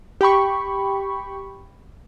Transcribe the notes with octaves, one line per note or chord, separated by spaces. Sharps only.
G4 G5 B5 C#6